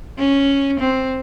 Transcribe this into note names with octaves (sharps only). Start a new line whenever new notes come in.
C#4
C4